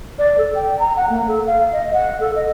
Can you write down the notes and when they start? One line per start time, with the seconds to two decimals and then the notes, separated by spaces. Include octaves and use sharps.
0.19 D5
0.38 A4
0.55 G5
0.79 A#5
0.96 F#5
1.10 A#3
1.28 A4
1.47 F5
1.73 D#5
1.94 F#5
2.20 A4
2.36 D#5